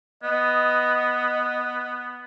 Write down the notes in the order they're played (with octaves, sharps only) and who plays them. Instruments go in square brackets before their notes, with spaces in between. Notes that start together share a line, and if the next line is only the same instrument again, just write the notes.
[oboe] B3 [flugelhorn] D#5